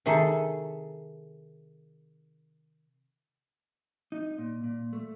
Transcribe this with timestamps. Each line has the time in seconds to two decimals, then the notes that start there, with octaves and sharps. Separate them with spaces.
0.06 C3 D#3 G#4 A4
4.12 D#4
4.38 A#2
4.64 A#2
4.93 A3